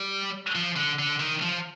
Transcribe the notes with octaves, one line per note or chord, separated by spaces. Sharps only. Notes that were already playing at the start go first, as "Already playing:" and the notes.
Already playing: G3
F3
D3
D3
D#3
F3